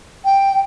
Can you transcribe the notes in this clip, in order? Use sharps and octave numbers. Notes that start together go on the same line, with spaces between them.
G5